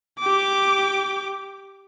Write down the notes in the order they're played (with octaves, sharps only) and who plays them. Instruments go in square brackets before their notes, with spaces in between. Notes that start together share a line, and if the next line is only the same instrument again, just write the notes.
[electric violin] G4 D6